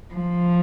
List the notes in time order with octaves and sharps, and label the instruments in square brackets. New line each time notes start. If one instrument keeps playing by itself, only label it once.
[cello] F3